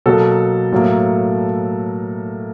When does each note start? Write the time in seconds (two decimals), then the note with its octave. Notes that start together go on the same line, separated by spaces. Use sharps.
0.06 B2 F#3 A#3 A4
0.72 A2 F#3 A#3